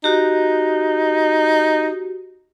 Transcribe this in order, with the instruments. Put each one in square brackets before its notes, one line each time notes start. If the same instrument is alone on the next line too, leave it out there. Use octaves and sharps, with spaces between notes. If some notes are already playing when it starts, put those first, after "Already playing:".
[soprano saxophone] D#4 [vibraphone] F#4 G4